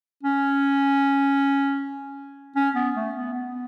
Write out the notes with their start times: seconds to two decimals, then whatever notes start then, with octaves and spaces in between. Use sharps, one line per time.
0.23 C#4
2.56 C#4
2.75 B3
2.96 A3
3.15 B3
3.34 B3